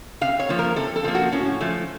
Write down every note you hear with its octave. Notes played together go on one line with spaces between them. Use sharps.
C3 F5
C#5
F3 A#3
A#4
C3 A4
A4
F3 A#3
F#4
A2 C#4
F3 A3